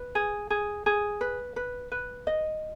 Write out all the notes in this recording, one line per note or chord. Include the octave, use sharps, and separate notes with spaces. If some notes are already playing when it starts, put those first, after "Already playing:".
Already playing: B4
G#4
G#4
G#4
B4
B4
B4
D#5